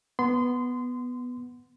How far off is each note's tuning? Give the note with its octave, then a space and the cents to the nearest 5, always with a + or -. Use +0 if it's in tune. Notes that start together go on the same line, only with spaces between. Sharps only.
B3 +0 C6 -25